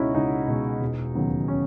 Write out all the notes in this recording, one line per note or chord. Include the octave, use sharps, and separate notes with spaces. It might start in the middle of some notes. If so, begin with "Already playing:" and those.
Already playing: C#2 B2 G#3 C#4 D#4 E4 F#4
C#2 D#4
B2 G#3
E1
D#2 C#3 F#3 B3
C#4